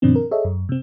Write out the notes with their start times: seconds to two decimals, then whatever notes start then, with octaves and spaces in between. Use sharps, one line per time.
0.02 G2 B2 D#3 F3 C4 D4
0.16 A#4
0.31 G#4 A4 C#5 D#5 E5
0.45 F#2
0.69 C3 C4